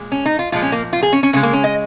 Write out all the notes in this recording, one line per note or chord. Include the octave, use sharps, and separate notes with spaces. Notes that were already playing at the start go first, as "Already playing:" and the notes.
Already playing: A#2 G#3
C#4
D#4
F4
A#2 F3 G#3 F4
C#4
A#3
F4
G#4
C#4
C#4
C#3 G#3 C#4
A#3
C#4
D#5